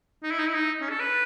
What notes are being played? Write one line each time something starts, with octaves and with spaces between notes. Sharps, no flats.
D#4
E4
D#4
E4
D#4
C#4
A4
B4